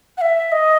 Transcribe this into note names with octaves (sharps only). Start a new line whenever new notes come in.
F#5
E5
D#5